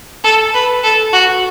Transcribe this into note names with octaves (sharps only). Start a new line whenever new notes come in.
A4
B4
A4
F#4